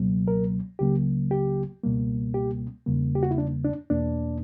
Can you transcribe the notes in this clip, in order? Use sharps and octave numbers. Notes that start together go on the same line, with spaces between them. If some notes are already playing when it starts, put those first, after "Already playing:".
Already playing: C#2 B2 F#3 A#3
A#4
C#2 C#3 F#3 A#3 G4
G4
C#2 B2 G3 A#3
G4
E2 C#3 G3 A#3
G4
F#4
E4
D4
D4
E2 B2 A#3 D4